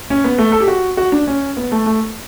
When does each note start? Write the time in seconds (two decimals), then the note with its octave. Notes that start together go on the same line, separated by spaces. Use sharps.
0.10 C#4
0.24 B3
0.38 A3
0.52 A4
0.60 G4
0.68 F#4
0.97 F#4
1.12 D4
1.28 C#4
1.57 B3
1.72 A3
1.86 A3